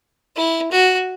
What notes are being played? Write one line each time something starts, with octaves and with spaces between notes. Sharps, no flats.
E4
F#4